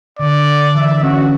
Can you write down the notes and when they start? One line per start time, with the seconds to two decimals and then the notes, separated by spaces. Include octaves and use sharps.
0.19 D3 D5
0.75 E3 E5
1.03 C#4 F#4